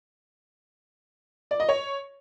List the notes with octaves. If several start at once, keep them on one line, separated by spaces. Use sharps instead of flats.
D5
D#5
C#5